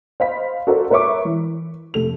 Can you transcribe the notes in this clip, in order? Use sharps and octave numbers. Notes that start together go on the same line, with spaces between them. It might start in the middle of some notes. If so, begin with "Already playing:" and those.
C5 D#5 F5 B5 B6
F#4 A4 A#4 C5 D5
A#4 B4 C#5 E5 C#6 D6
E3
F1 A3 F7